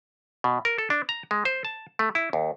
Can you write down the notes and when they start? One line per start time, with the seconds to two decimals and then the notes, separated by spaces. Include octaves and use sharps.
0.44 B2
0.65 A#4
0.78 A4
0.90 D4
1.09 A#5
1.31 G#3
1.45 C5
1.65 A5
1.99 A3
2.15 E4
2.33 D#2